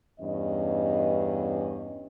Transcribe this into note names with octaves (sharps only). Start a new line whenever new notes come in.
E2 G2 C#4 D#5